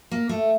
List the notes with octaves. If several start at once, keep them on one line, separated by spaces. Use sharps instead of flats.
A#3
A3